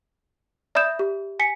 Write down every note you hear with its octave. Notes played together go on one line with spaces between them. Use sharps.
D5 E5 B5 D#6 G6 E7
G4
G#5 B6 C#7